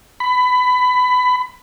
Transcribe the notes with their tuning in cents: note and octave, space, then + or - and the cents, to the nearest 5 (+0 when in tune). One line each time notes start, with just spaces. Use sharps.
B5 +20